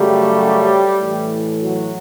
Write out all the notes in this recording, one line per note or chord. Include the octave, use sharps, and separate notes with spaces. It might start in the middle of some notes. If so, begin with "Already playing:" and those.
Already playing: F#2 C#3 F#3 G3 A3 G4
A2 E3 A3
F#3 F#4